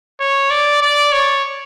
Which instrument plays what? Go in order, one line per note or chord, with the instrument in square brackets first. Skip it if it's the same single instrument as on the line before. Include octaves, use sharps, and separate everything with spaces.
[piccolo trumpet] C#5
D5
D5
C#5